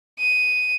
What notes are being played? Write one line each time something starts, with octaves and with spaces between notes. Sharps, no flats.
D#7